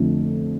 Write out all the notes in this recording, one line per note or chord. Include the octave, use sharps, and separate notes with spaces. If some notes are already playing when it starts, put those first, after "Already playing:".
Already playing: F2 D3 F3 A3 D4